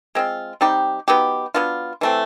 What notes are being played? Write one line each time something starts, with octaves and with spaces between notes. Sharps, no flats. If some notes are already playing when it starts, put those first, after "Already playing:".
G#3 C4 F4
G3 C4 D#4 G4
F#3 B3 D#4 G4
F#3 B3 D4 F4
E3 A3 C4